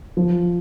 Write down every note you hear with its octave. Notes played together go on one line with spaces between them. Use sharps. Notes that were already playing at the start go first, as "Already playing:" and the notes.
F3